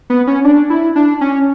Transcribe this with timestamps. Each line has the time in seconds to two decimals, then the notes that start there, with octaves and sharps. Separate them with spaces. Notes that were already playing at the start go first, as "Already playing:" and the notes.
0.10 B3
0.27 C#4
0.44 D4
0.70 E4
0.96 D4
1.21 C#4